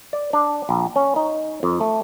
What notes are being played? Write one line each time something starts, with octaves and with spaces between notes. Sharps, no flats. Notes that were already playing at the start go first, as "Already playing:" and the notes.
D5
D4
A#1
C#4
D#4
F2
A3